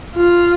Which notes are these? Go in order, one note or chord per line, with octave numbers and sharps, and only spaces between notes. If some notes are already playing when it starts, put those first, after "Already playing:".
F4